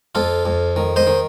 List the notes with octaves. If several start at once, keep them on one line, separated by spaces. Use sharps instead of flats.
F2 F4 A4
F2
D#3
C5 D#5
D#3